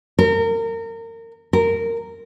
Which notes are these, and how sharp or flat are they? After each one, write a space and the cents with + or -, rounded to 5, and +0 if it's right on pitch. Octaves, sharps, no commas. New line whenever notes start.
A#4 -30
A#4 -15